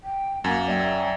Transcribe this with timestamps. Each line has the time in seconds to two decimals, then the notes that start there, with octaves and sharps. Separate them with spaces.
0.03 G5
0.44 F#2 A#3 F#5
0.68 F#3 D5 E5 G5